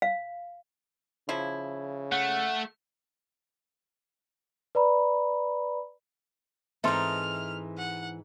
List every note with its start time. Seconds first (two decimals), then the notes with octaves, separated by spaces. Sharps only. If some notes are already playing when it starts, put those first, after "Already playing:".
0.02 F5
1.29 C#3 F3 E4
2.12 A3 F#5
4.75 B4 D5 A#5 B5
6.84 G#2 E3 C4 D#4 A4 E5 C6 F6
7.77 F#5